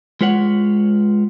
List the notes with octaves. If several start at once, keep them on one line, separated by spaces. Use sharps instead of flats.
G#3 F4 B4 C#5 F#5